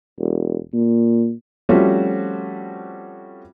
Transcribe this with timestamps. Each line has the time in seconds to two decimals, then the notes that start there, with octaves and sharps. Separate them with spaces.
0.19 E1
0.73 A#2
1.69 F3 G3 A3 C4 C#4 F#4